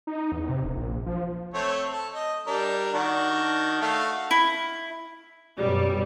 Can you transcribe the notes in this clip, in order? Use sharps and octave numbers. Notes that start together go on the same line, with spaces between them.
D#4
E2
C3
E1
A#1
F3
A3 C4 C#5
A4
D#5
G3 D4 A#4
D#3 D4 F#4
A3 F#4 F5
E4
F#2 B2 G3